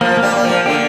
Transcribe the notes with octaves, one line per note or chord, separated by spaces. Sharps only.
F3 A#3
A#3
G3
G3 A#3
F3
A#3
D3 G4